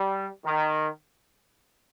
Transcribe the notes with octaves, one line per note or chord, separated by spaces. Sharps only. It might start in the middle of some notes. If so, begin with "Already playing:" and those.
Already playing: G3
D#3